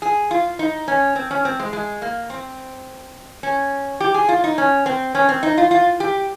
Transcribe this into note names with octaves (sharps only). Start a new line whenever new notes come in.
G#4
F4
D#4
C#4
C4
C#4
C4
G#3
G#3
A#3
C4
C#4
G4
G#4
F4
D#4
C#4
C4
C#4
C4
D#4
F4
F4
G4